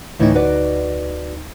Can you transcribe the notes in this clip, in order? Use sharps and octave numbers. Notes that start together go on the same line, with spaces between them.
D2 A2 D#3 E3 D#4
F#4 B4 D5